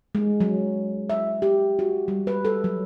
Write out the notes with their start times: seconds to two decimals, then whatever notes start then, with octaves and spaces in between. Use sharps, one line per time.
0.15 G#3
0.40 F#3
1.10 E5
1.42 G4
1.79 F#4
2.08 G3
2.27 B4
2.45 A4
2.64 F#3